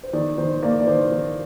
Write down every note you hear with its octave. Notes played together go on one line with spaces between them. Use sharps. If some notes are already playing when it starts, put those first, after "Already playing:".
C5
D#3 D5
D#3 C5
A#3 D5
D5
D#3 C5
D#3